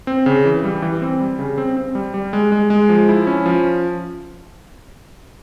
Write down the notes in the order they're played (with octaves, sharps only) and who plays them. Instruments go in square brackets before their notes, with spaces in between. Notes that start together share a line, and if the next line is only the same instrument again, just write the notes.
[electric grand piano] C4
C#3
E3
G3
E3
C4
G3
C#3
C4
C4
G3
G3
G#3
G#3
G#3
F3
E4
C#4
F3